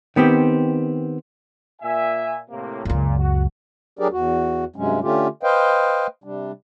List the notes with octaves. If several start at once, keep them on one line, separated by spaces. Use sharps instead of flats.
D#3 B3 C4 G4
A#2 E5 G#5
A2 C3 A#3
C#2 F#2 A#2
F#4
F#3 D4 G4 G#4 A#4 D5
E2 F#4
G2 C3 F#3 G#3 C#4
D3 A3 C#4 F4 G4
B4 C5 D#5 F5 G5
C3 G3 D4